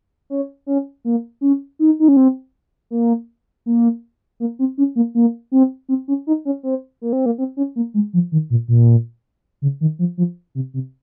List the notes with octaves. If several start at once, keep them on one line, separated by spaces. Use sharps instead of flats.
C#4
C#4
A#3
C#4
D#4
D#4
C#4
C4
A#3
A#3
A#3
C4
C#4
A#3
A#3
C4
C4
C#4
D#4
C#4
C4
A#3
C4
A#3
C4
C#4
A#3
G#3
F3
D#3
A#2
A#2
C#3
D#3
F3
F3
C3
C3